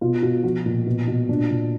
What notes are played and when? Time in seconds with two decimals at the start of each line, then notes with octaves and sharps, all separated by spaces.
0.01 B2 F4
0.23 B2 F#4
0.43 F3 F#4
0.66 A#2
0.87 B2
1.08 B2
1.29 A#2 D4
1.50 A#2